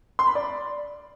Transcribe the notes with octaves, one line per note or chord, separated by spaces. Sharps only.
C6
B5
D5